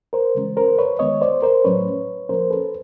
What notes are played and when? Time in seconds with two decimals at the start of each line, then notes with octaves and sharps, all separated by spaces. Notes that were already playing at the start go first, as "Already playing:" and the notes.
0.13 A#4 C5
0.35 C#3 E3 G#3 C#4
0.57 A#4 C5
0.78 B4 C#5
0.99 D#3 G#3 B3 C#5 D#5
1.21 C5 D5
1.42 A#4 C5
1.64 A2 F#3 A3 C#4 B4 C#5
2.29 A#2 F3 A#3 C#4 A#4 C5
2.51 A4 B4